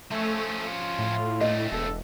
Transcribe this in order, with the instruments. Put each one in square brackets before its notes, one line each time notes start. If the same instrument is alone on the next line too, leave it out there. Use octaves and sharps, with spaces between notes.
[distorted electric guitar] F3 C#4 [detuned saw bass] A3
[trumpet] F4
[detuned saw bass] A2
[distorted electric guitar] G2 A3 [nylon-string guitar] D#5
[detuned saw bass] E1 [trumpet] A4